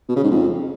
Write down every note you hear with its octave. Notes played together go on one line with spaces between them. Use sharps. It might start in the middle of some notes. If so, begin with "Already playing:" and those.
B2
C#3
G#2
F2